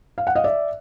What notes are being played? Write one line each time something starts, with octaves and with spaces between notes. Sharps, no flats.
F5
F#5
D#5 F5
D5 E5